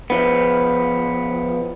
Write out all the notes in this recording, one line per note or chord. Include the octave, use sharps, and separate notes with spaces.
F3 B3